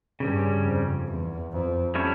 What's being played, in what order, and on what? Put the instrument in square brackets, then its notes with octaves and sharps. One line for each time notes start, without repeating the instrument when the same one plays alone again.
[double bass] G2 [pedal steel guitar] C#3 G3 C#4
[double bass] F2
E2
F2
[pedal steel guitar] G3 C#4 E4 A4 C#5